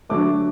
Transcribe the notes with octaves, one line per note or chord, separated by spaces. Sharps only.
D3 F#3 A3 D6